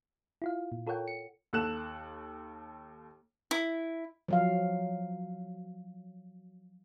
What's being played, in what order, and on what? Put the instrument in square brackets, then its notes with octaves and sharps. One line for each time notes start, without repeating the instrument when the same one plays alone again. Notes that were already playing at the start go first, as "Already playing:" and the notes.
[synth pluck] E4 F4 F5
A#2
F4 A4 A#4 C#5 F#5 G5
C#7
[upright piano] D#2 A4 F#6 E7
[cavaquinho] E4
[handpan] F3 F#3 F5